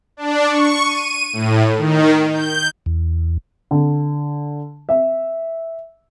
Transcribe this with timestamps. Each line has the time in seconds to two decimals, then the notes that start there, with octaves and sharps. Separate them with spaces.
0.17 D4
0.49 C#6
0.83 D#7
1.33 A2
1.78 D#3
2.31 G6
2.86 E2
3.71 D3
4.89 E5